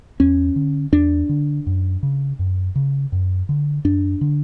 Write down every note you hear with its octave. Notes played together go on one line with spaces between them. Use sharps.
E2 C#4
D3
E2 D4
D3
F#2
C#3
F#2
C#3
F#2
D3
F#2 D4
D3